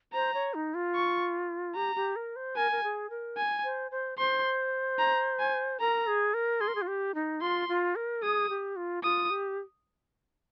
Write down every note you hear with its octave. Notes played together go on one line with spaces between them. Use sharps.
C5 A#5
C#5
D#4
F4
C#6
G4 A#5
G4
A#4
C5
A#4 G#5
A#4
G#4
A#4
G#5
C5
C5
C5 C6
A#5
G#5
A#4 A#5
G#4
A#4
G#4 C6
A#4
G#4
F4
G4
D#4
F4 C6
F4
A#4
G#4 D#6
G4
F4
F4 D#6
G4